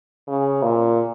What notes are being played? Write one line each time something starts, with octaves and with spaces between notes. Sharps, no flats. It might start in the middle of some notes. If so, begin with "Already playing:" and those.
C#3
A#2